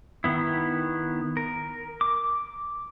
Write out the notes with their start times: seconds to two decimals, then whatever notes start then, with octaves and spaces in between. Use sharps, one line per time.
0.24 D#3 B3 E4
1.37 A#4
2.01 D6